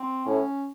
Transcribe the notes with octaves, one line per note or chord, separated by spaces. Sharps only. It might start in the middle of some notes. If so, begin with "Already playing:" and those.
Already playing: C4
A2 C#4